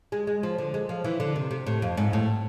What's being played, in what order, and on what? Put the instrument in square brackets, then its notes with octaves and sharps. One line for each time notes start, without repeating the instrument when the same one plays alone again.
[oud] G#3
G#3
F3
D3
G#3
F3
E3
D3
C3
C3
A2
F2
G#2
A2